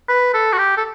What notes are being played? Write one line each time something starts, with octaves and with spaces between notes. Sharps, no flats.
B4
A4
F#4
G4
A4